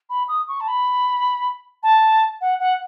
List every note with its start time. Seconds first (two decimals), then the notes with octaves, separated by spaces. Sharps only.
0.10 B5
0.28 D#6
0.48 C#6
0.60 A5
0.68 B5
1.83 A5
2.41 F#5
2.60 F#5